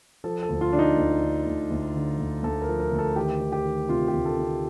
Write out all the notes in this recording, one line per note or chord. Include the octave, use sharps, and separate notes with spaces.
F3 A4
A4
D2
F4
D3 D4
D#4
D2
D3
D2
D2
D3
D2
D2 A4
A#4
F3
A#4
D2
A4
D#3 G4
D#3
G4
D#3
C3 F4
G4
D2
A4
C3